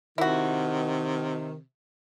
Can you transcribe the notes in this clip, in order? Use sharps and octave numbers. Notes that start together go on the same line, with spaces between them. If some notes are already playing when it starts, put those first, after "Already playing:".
C3 D#3 E4 F#4